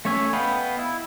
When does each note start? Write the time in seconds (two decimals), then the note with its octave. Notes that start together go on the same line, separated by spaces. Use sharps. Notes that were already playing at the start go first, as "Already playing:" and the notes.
0.05 A3 C#4 C#5 E5 G#5
0.33 B3 D#5 F5 G5 B5
0.78 E4